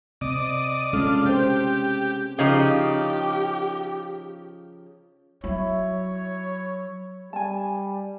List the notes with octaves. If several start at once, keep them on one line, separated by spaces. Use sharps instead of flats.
C3 C4 D5 D#5
G#3 C#4 D4 F4 A4
C4 G4 C5
C#3 F3 D#4 G4
F#3 E4 C#5
G3 G#5 A5